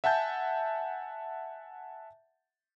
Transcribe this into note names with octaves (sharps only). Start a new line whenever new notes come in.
E5 F#5 G#5 A5 G6